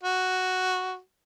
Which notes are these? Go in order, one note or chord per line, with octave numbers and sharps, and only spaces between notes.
F#4